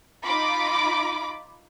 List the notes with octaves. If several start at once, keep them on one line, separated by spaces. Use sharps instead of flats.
D#4 F4 B5 D6